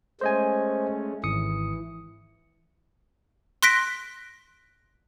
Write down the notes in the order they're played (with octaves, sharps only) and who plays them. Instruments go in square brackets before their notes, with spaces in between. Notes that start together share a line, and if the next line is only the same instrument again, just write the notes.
[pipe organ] G#3 A3 C#4 [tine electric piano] C5 D#5 G#5
[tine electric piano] G#1 D#6 C#7 [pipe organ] E3
[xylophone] C6 F#6 A#6 B6 D7